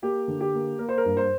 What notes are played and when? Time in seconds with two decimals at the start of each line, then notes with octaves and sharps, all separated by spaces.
0.02 A#3 G4
0.28 D3
0.41 G4
0.54 A#3
0.79 A#3 A#4
0.89 C5
0.98 A#4
1.05 G2
1.17 C5